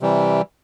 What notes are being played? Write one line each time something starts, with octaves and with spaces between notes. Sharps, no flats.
C3 E3 G3